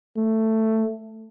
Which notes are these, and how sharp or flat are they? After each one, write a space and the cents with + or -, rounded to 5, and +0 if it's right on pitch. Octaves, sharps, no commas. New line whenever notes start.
A3 +10